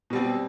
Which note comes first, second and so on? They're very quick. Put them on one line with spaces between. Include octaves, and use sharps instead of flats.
B2 G3 C4